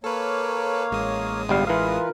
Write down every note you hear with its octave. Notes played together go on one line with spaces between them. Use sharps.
A#3 A4 B4 C#5 F5
A1 G#3 D#6
G1 G3 F5
E3 F4 A#4 B4 F5